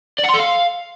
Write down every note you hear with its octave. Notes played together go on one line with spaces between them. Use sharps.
D5
F#5
C6
A4
F5